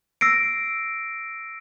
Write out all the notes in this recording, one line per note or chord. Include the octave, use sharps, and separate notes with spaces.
E6 A#6 C7 D7